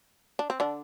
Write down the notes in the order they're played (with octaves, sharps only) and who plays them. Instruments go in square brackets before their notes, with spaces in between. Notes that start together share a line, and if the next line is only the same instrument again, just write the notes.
[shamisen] D4
C4
D3 D4